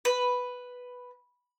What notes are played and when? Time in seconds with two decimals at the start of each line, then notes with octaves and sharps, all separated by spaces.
0.05 B4